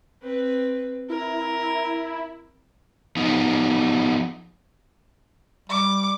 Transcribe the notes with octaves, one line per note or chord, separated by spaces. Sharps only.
C4 B4
E4 A#4
F3 B3 D#4
G3 D6